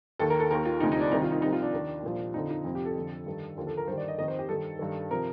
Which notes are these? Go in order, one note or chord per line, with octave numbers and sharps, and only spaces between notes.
D#2 D#3 A4
A#4
A4
D#2 D#3 A#4
F4
D2 C3 F3 D#4
D#4
D4
C2 C3 D#3 D#4
F4
D#4
C2 C3 F3 D#4
F4
D4
D#2 D#3
C2 A#2 F3
F2 D3 F3 D#4
D#4
F2 C3 F3
G4
A4
F2 D3 F3
G2 D#3
D#2 D3 F3
A4
A#4
G2 D#3 C5
D5
D#5
F2 D#3 D#5
C5
G4
G2 D#3 A4
G2 D#3
C3 F3 A#4